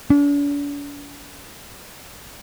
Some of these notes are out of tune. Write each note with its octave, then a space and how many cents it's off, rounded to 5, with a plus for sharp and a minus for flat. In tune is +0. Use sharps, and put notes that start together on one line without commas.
D4 -45